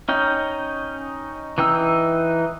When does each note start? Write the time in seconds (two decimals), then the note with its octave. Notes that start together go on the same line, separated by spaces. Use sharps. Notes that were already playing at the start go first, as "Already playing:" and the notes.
0.09 C#4 D#4 G5
1.58 E3 D#4 G5 E6